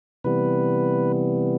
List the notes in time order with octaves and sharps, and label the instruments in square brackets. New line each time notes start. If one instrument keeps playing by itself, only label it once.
[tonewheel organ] C3 E3 G3 B3 B4